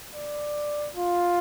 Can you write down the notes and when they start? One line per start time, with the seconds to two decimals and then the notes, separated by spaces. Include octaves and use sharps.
0.14 D5
0.96 F4